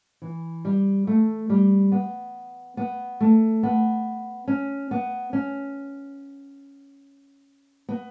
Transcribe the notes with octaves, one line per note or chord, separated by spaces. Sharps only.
E3
G3
A3
G3
B3
B3
A3
B3
C#4
B3
C#4
B3